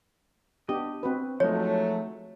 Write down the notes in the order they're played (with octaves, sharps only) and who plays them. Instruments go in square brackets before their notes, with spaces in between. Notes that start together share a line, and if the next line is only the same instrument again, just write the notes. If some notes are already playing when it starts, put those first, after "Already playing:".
[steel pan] B3 D4 G4 [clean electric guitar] D#5
[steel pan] C4 F#4 B4
[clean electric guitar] F3 G#3 D#4 [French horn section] F#3 A3 [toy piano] C#5